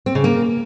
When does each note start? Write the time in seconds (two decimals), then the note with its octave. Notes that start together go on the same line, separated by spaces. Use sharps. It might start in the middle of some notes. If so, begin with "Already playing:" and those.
0.06 C4
0.15 C#3
0.24 A#3